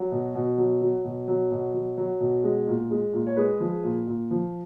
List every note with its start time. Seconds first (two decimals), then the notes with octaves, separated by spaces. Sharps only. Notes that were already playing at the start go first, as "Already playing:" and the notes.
Already playing: F#3
0.12 B2
0.35 B2
0.58 F#3
0.81 F#3
1.04 B2
1.28 F#3
1.51 B2
1.74 F#3
1.97 F#3
2.20 B2
2.44 G#3
2.67 A#2
2.91 G#3
3.13 A#2
3.27 C#5
3.36 G#3 G#4 B4
3.60 F3
3.84 A#2
4.07 A#2
4.31 F3